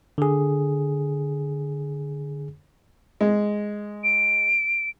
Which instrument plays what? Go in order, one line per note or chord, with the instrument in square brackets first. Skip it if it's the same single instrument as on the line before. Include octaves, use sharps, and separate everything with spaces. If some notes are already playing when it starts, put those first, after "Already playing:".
[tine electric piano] D3 G#4
[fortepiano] G#3
[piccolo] D7